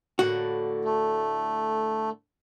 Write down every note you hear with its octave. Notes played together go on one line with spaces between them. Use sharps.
A2 D3 A#3 F#4
A3